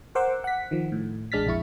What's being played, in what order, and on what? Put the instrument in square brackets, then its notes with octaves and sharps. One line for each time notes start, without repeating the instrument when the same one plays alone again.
[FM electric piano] A#4 C5 F#5 C6 D6 E6
F#5 B6
D#3 F3
A2
A1 G#3 D4 F6 A6 B6
A#1 F2 E4 C#6